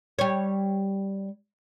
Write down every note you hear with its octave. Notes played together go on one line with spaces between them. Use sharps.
G3 C#5